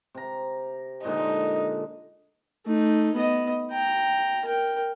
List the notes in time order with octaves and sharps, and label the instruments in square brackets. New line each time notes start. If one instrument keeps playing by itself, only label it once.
[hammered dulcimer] C3 A#5
[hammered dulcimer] A#2 D3 G#3 [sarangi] D#4
[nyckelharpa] A3 D#4
B3 D#5
G5 A#5
A#4 G5